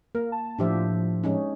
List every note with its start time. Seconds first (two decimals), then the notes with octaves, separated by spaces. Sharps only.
0.15 A#3 A#4
0.32 A5
0.59 A2 F3 D4 G4 E5
1.24 G#3 C#4 D#4